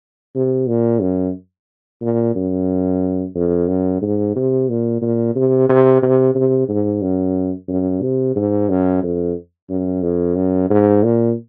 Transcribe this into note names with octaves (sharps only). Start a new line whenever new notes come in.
C3
A#2
F#2
A#2
F#2
F2
F#2
G#2
C3
A#2
A#2
C3
C3
C3
C3
G#2
F#2
F#2
C3
G#2
F#2
F2
F#2
F2
F#2
G#2
A#2